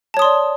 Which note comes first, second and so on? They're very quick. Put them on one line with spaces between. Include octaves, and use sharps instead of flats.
A5 C#5 D#6 C6 D5